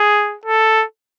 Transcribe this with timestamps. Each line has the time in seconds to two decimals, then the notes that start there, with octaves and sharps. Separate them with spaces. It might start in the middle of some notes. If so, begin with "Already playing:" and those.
Already playing: G#4
0.45 A4